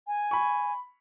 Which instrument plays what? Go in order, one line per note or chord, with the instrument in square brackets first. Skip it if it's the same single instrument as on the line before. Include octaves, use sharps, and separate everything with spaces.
[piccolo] G#5
[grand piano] B5 C#6